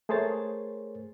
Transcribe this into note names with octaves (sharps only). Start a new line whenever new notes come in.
A3 G#4 A#4 C5 C#5 A6